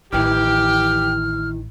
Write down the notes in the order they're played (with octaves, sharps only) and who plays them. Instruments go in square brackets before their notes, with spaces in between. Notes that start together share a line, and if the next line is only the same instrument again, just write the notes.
[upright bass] A1 [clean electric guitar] D#3 E3 [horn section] G4 G5 [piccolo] F6